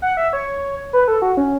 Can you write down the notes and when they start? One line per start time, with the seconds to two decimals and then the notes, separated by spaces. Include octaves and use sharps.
0.02 F#5
0.17 E5
0.33 C#5
0.93 B4
1.08 A4
1.22 F#4
1.37 C#4